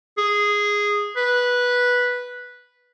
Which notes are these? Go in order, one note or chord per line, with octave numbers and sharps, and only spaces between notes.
G#4
B4